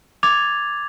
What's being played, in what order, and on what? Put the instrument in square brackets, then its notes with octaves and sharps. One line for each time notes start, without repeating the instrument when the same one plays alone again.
[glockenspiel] D6 G#6 A6 F7